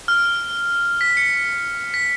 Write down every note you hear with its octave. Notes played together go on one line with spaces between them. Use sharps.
F6
B6
C#7
B6